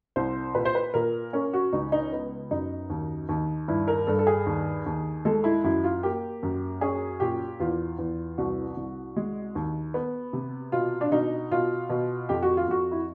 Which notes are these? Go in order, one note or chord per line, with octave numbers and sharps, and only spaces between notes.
C2 C5
A#2 B4
C5
B4
A#2 A#4
C#4 A#4
F#4
C#2 D#4
D#4
B3
F#2 D#4
D#2
D#2
G2 E4
A#4
G2 A4
A4
G#4
D#2
D#2
G#3 A4
E4
F#2 E4
F4
A#3 G4
F#2
C#4 G#4
A#2 G4
E2 F4
E2
C2 F#4
C2
G#3
D#2
B3
C3
B2 F4
D4
B2 D#4
B2 F4
B2
F2 G4
F#4
F4
F2 F#4
E4